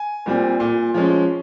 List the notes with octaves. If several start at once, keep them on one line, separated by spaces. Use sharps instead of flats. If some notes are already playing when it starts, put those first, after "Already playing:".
Already playing: G#5
A#2 G3 C4
A#2
F3 G#3 C#4